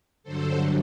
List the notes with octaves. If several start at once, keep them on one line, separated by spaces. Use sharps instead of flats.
G2 D3 F#3 A4 C5